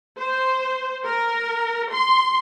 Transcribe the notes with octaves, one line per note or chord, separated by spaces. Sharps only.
C5
A#4
C6